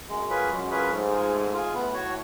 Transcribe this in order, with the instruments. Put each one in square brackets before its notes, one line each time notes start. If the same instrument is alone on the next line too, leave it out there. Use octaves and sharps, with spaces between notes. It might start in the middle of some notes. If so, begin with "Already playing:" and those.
[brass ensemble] F#2 [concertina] G#3
[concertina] C#4 F4 G#4 B4
[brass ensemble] F#2 [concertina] G#3
[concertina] C#4 F4 G#4 B4
[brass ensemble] G#2 [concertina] A3
[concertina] F4 G#4
A3
F4 G#4
[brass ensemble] A2 [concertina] B3
[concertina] F#4 C#5